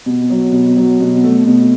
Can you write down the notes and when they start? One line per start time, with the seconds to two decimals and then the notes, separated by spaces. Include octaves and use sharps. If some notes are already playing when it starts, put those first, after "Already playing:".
0.06 B2
0.30 F#3
0.52 B2
0.77 F#3
1.00 B2
1.24 A3
1.46 B2